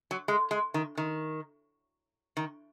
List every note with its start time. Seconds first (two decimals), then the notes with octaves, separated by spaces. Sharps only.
0.11 F#3
0.28 G#3
0.51 G#3
0.74 D#3
0.97 D#3
2.37 D#3